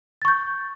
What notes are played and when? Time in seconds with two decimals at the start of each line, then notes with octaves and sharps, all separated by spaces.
0.22 A6
0.25 C#6
0.28 G6